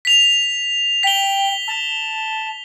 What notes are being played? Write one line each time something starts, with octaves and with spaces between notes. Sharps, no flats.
B6 F7
G5 B6 G7
A5